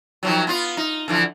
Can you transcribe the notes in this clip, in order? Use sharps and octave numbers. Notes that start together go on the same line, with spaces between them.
D#3 F3 F#3
B3 F4
D#4
D3 E3 F3